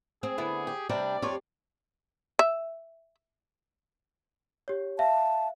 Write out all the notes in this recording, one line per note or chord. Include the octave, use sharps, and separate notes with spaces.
C4 G#4
D3 B3 E4
G4
C3 G3 C4 D4 D5
F2 F4 G4 C#5
E5
G4 C#5
E5 F5 A5